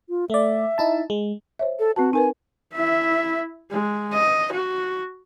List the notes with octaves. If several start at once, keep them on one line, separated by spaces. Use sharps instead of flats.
F4
A3 D5 E5
D#4 E4 A5
G#3
C5 C#5 E5
A4
C4 F#4 B4 A5
D#4 A#4 B4 G#5
E4 E5
G#3
D#5
F#4